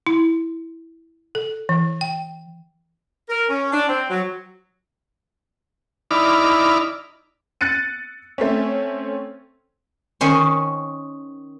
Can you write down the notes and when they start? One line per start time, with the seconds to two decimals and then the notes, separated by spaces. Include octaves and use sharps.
0.07 E4
1.35 A4
1.69 E3
2.01 G5
3.29 A#4
3.48 C#4
3.72 D4
3.88 C4
4.10 F#3
6.11 D#4 E4 D5 B5 D6 F6
7.61 F#6 A6 C#7 D#7
8.38 A3 C4 C#4
10.21 D#3 C#4 C5